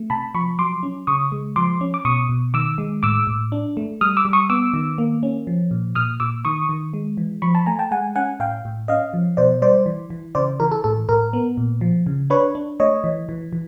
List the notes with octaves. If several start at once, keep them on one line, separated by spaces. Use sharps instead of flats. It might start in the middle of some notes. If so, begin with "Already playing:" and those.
Already playing: A3
C3 A5 B5
F3 B5 C#6
F#3 C6 D6
C#4
C#3 C#6 D#6
G#3
F3 C6 D6
C#4
D6
B2 C#6 D#6
B2
D#3 D6 E6
G#3
A2 D6 E6
A2
D4
A3
G3 D#6 F6
D6 E6
G3
C#6 D#6
B3 D6 E6
D#3
A#3
C#4
F3
A#2
A#2 D#6 F6
A#2 D6 E6
D#3 C#6 D#6
D#3
G#3
E3
F3 B5 C#6
A5 B5
A3 G#5 A#5
G5 A5
G#3 F#5 G#5
C#4 F#5 G#5
A2 F5 G5
A2
C#4 D#5 F5
F3
B2 C5 D5
G3 C5 D5
E3
E3
C#3 C5 D5
E3 A#4
A4
A2 A4
A2 A#4
B3
A#2
F3
C#3
D4 B4 C#5
D4
A3 C#5 D#5
E3
E3
E3